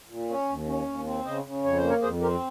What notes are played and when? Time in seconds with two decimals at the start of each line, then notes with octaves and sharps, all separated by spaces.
0.10 A#2
0.29 C#4
0.49 D#2
0.67 C#4
0.87 D#2
1.06 C4
1.25 C#3 C5 D#5
1.45 C#3
1.64 F2 C#5
1.77 C5
1.83 A#3
1.89 A#4 C#5
2.02 F2 G#4 C5
2.21 C4 G4 A#4